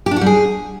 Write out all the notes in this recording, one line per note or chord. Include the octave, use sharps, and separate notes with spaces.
G4
D4
F#4
G3
G#4